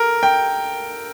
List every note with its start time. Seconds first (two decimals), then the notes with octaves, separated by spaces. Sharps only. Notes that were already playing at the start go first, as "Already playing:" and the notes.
Already playing: A4 A#4
0.23 G5